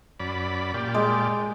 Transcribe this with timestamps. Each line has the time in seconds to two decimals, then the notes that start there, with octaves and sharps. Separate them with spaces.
0.20 F#2 D5 B5
0.74 A#2 G4 D5
0.94 G#3